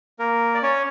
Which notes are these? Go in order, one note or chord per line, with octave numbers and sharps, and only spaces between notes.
A#3 A#4
D5
C#4 C#5